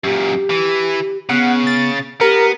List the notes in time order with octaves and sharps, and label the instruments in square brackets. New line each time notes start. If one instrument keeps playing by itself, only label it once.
[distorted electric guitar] F#2 A#2 [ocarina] G4
[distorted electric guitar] E3
[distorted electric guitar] C#3 [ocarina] B3 [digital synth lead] F#5
[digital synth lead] A6
[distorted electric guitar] B3 [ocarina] G4 [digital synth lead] A#4